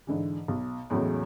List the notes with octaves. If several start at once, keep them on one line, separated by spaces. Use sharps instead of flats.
G#2 D3 E3
B1
E2 A2 C#3 F#3 G#3